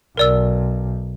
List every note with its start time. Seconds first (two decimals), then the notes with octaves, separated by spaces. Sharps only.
0.17 B1 A#4 D5 E6